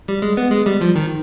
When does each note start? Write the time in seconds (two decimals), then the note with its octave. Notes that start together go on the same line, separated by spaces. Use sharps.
0.08 G3
0.22 G#3
0.37 B3
0.51 G#3
0.66 G3
0.81 F3
0.95 D#3